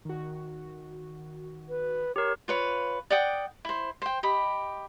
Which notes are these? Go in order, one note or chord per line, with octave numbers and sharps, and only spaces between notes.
D#3 F#4
B4
G4 A#4 C#5
F4 B4 C#5
D5 F#5 G5 D#6
E4 C5
C5 G5
G4 D#5 B5